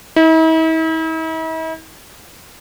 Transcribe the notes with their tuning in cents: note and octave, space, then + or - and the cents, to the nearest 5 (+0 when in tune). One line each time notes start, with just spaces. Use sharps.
E4 -45